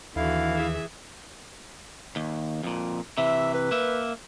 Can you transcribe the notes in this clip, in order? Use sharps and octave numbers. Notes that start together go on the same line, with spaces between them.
D#2 D3 E3 E4 F#4 F5
G#4 E5
D#2
F2 A#2
C3 E3 E5
B4
A#3 E5